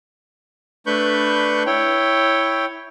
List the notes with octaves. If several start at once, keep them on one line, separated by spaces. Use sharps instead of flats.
A3 D4 B4 B5 C#6 G6
E4 C#5 G5